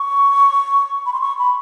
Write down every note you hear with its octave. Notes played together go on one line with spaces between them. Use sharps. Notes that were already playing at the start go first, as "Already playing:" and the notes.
Already playing: C#6
B5
C6
C#6
B5